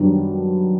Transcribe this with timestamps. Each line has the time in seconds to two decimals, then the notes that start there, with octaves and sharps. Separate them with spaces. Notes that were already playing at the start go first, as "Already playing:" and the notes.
Already playing: F#2 D#3 G3 B3 D4